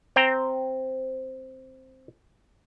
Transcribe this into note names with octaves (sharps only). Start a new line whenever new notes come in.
C4 G5 A#5